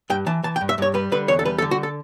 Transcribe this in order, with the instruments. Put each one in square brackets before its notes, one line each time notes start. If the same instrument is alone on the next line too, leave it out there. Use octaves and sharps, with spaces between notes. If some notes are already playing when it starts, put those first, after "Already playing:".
[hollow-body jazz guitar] G2 G5
E3 A5
E3 A5
G5
G2
E5
G2 C#5
G3 B4
D3 B4
E2 C#5
A4
G3 B4
A4
D3
F#4
A4